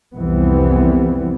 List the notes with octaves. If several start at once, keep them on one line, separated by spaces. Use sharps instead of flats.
C2 F2 E3 G3 B3 C4